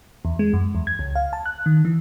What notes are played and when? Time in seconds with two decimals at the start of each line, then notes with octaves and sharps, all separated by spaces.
0.25 E2
0.39 G#3
0.53 F#2
0.75 E2
0.87 G#6
0.99 C#2
1.15 F5
1.33 A5
1.46 F#6
1.66 D#3
1.85 E3